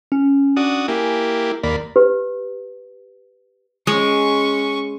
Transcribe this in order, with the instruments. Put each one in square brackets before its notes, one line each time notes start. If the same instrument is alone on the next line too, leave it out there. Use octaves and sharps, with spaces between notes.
[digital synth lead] C#4
[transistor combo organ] D4 F#4 D#6
[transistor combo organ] A#3 E4 G4 [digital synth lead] G#5
[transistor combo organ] D#2 A#3 B5 [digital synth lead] D5
[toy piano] G4 B4
[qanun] G#3 [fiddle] C#4 C#6